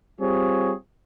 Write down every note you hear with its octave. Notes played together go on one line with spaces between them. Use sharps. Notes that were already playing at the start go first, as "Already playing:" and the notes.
G3 C4 F4 G#4 C#5